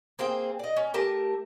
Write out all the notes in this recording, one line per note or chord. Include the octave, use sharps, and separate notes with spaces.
A#3 C4 G#4 G5
D5 D#5
C#4
A3 G4 A#4 A5